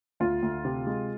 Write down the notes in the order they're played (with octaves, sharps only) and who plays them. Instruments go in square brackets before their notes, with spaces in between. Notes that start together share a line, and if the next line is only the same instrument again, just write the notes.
[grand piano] D2 [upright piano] F4
[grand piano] D2
C3
G#3